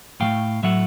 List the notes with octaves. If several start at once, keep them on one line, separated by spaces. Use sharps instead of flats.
A2 F#3 A3 F5 G5
A2 F#3 A3 E5 F#5